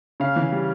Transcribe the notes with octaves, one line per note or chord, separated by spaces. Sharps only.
C#3 F5
E3
G3